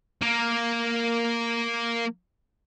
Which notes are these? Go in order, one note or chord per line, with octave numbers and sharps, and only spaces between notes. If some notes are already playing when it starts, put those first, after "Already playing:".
A#3 A#4